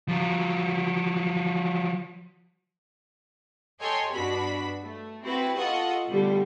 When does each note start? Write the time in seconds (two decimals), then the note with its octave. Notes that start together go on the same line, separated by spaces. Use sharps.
0.08 F3 F#3
3.80 A4 C#5 D#5 G5 G#5 C6
4.12 G2 B2 D4 F#4 B5 B6
4.83 A3
5.23 C4 E4 F#4 B4
5.55 F4 A4 D#5 F#5 C#6 D#6
6.07 B2 D3 G3 A3